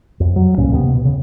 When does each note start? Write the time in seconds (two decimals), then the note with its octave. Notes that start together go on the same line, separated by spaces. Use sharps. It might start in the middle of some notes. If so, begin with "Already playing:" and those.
0.20 F2
0.36 F#3
0.57 C2 G2 A#2 C#4
0.72 D#2 C3 G#3 B3
0.93 B2
1.05 C#3